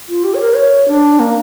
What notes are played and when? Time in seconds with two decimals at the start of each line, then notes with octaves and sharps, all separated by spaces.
0.09 F4
0.24 G4
0.34 C#5
0.41 A#4
0.56 C#5
0.88 D4
1.19 A#3